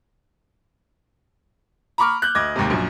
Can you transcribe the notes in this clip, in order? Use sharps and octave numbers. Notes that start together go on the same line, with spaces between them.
A#5 B5 C#6 D6 F6
F#6 G6
D2 D#5 D6 G#6
D#2 G#2 C3
A#1 F#2